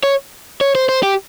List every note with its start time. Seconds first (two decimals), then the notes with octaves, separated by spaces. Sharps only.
0.03 C#5
0.61 C#5
0.75 C5
0.89 C5
1.03 G4